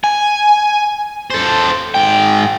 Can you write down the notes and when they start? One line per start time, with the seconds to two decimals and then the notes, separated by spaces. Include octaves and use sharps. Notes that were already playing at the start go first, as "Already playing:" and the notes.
0.04 G#5
1.30 A4 C5
1.94 G#2 G5